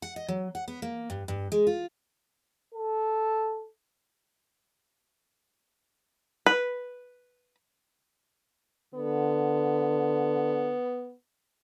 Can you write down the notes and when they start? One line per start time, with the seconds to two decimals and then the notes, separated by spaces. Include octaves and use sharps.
0.02 F#5
0.16 D#5
0.28 F#3
0.55 F#5
0.68 B3
0.82 A#3
1.10 G2
1.28 G2
1.52 G#3
1.67 F4
2.74 A4
6.46 B4
8.94 D3 B3